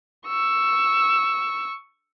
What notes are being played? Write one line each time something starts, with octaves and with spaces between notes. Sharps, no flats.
C#6 E6